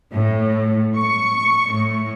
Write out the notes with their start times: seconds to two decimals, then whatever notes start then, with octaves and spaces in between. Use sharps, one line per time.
0.12 A2
0.96 C#6
1.73 A2